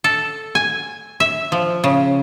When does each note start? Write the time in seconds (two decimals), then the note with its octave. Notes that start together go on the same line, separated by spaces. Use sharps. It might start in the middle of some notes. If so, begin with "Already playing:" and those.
0.04 A4
0.55 G#5
1.20 E5
1.52 F3
1.84 C#3